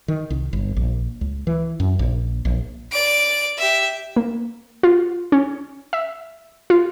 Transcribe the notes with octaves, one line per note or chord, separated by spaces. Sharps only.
D#3
C2
G1
A#1
C#2
E3
F#2
A#1
A#1
D5 D7
G4 E5
A#3
F4
C#4
E5
F4